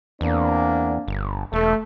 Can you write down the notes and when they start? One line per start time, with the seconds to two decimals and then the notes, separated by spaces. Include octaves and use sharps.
0.21 E2 A#3 C4 D4
1.08 G1
1.53 E1 A3